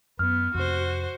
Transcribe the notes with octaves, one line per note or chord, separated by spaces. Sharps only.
F#2 B3 F6
F2 C3 F#4 C5